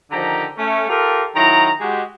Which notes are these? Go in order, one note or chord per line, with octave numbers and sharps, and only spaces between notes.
D3 D#3 F3 G4 A#5
A3 C#4
F4 G4 A4 A#4
D#3 F#3 E4 A#5
G#3 F#4 G4